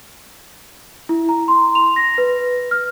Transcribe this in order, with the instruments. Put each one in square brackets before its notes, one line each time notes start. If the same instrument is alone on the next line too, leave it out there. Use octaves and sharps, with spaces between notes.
[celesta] E4
A#5
C6
F7
A#6
B4
F6